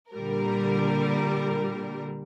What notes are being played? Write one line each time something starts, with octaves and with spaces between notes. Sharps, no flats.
A#2 D3 G3 A#4